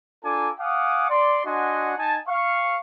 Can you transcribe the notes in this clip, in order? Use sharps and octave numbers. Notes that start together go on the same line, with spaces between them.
D4 F4 A4 G#5 A#5 D6
F5 F#5 G#5 D6 D#6
D5 C6
D4 F#4 D#5 F#5 G#5 C6
D#4 G#5 A5
F5 C#6